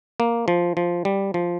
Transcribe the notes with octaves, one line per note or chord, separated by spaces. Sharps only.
A#3
F3
F3
G3
F3